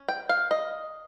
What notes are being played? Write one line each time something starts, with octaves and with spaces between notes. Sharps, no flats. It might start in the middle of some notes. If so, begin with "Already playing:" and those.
Already playing: C#4
G5
F5
D#5